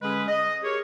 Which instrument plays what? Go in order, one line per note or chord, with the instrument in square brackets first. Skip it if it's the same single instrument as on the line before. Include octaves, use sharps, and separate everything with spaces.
[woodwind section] D3 G#3 C#4 G#4 B4
D#5
G4 G#4 A#4 C#5